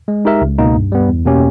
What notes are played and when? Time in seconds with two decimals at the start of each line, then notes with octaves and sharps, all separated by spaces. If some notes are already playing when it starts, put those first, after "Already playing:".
0.08 G#3
0.25 D#4 G4 A#4 E5
0.41 C#2
0.58 B2 A#3 D#4
0.75 G2
0.92 G3 B3
1.09 E2
1.25 B2 A#3 C#4 G4